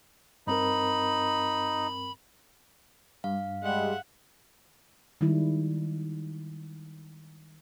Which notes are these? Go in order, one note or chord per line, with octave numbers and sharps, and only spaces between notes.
G2 C4 D#4 A#4 B5
G2 F5
G3 G#3 E5 F#5
D#3 G3 G#3 E4